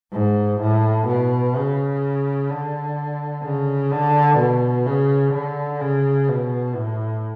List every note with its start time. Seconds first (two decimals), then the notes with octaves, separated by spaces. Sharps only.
0.13 G#2
0.61 A2
1.07 B2
1.56 C#3
2.50 D3
3.44 C#3
3.92 D3
4.39 B2
4.87 C#3
5.34 D3
5.81 C#3
6.29 B2
6.76 A2